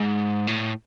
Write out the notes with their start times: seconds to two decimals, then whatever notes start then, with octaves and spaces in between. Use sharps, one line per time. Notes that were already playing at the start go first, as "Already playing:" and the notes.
Already playing: G#2
0.48 A2